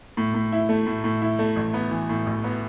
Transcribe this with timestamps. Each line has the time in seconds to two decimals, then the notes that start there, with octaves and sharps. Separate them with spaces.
0.17 A2
0.34 A2
0.52 E4
0.69 A3
0.87 A2
1.04 A2
1.22 E4
1.39 A3
1.56 A1
1.74 B3
1.91 E3
2.09 A2
2.26 A1
2.44 B3